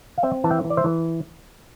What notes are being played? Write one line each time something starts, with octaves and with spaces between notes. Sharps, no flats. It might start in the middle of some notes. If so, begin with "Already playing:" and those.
F5
C4 E5 G5
E3 A5
E5 G5
E3
D5
C5 E5
E3